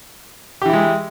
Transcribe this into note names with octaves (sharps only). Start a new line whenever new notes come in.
E3 G#3 E4 G4